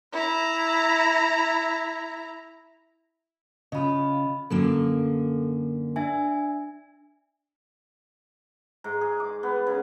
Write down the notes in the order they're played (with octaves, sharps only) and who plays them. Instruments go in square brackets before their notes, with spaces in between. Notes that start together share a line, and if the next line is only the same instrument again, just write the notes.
[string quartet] E4 A#5
[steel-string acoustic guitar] C#3 F4 [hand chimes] D#5 B5
[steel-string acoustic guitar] F#2 D3 A#3 [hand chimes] A4
[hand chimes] D4 E5 G#5
[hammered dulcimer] G#2
G#4
D6
B3
C#3